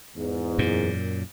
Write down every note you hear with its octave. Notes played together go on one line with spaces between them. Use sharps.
E2 G#2
F#2 A#2